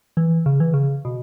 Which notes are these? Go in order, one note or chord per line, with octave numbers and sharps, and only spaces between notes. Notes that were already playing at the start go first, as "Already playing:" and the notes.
E3
C#3
E3
C#3
B2